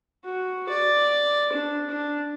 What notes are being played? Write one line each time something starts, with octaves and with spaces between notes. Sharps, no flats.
F#4
D5
D4
D4